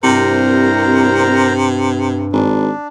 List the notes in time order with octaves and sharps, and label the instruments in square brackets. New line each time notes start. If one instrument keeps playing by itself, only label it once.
[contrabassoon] C2 [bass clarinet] G2 [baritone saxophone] C3 [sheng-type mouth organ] A#4 C5 A#5
[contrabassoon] G#1 [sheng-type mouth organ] D4